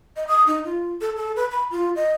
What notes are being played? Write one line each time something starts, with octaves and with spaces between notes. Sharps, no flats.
D#5
D#6
D#4
F4
A4
A4
B4
B5
F4
D#5